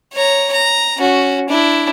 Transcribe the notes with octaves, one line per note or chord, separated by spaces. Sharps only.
C#5 A#5
A#5
C#4 F#4
D4 E4